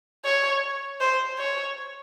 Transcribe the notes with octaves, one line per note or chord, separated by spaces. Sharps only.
C#5
C5
C#5